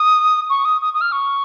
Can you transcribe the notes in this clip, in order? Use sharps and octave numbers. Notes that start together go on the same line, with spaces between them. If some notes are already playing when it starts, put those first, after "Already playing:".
Already playing: D#6
C#6
D#6
D#6
D#6
F6
C#6